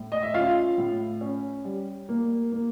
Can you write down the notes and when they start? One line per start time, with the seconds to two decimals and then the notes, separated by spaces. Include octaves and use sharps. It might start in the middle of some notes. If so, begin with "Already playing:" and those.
Already playing: A2
0.12 D#5
0.22 E5
0.34 C#4 F4 F5
0.78 A2
1.21 C#4
1.65 G3
2.09 A#3
2.52 A#3